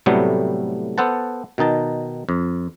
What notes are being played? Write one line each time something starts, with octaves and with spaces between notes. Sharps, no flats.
A2 C3 F#3 G3 A3 B3
B3 A4 C5 F#5 A5
B2 D#3 D#4 A5
F2